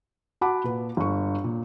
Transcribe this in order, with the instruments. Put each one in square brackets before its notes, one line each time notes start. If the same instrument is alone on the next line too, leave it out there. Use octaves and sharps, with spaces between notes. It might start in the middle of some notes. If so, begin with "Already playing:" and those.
[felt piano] F#4 F#5 A5 B5 D6
A#2 B4
G1 C#6
A#2